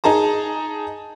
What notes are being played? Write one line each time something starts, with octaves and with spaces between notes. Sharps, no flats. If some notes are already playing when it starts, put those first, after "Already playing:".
D#4 G#4 A5 A#5